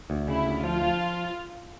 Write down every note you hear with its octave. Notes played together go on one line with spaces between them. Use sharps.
D2
C#3 E4
D2
F3 F4
F3